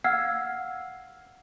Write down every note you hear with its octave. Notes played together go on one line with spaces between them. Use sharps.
F5 F#5 E6 F6 G#6 C7